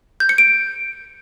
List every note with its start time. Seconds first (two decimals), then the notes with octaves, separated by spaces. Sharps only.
0.20 G6
0.29 C#7
0.38 D7